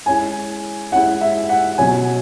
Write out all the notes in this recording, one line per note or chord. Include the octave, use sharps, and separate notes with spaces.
G#3 C#4 E4 G#5
G#3 C#4 E4 F#5
E5
F#5
B2 F#3 C#4 G#5